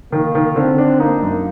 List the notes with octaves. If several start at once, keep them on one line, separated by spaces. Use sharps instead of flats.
D#3 A#3
D#3
D3 C4
D4
A#3 D#4
F#2